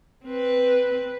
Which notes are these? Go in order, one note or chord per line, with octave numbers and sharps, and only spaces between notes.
C4 B4